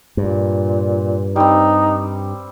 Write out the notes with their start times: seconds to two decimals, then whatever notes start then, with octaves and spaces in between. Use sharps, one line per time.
0.17 G2 A#2
1.36 G3 C4 D#4